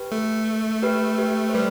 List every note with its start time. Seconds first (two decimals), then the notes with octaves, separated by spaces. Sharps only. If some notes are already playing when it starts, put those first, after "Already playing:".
Already playing: G4 B4
0.12 A3
0.82 G4 B4
1.18 G4 B4
1.49 C5
1.54 G3 G4 B4